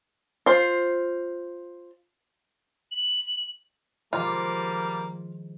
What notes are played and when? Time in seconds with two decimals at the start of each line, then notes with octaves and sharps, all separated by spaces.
0.46 F4 C5
2.91 F#7
4.13 D#3 F3 G3 G#3 A#3 F4